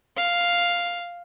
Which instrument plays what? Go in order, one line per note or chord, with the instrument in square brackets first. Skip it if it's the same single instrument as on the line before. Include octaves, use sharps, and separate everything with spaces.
[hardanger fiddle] F5